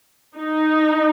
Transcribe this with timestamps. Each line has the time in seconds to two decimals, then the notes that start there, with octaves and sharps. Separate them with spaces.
0.36 D#4